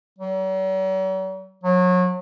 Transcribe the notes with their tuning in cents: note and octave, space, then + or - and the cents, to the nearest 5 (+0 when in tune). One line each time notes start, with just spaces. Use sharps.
F#3 +45
F#3 -30